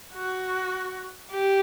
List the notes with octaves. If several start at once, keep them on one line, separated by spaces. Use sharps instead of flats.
F#4
G4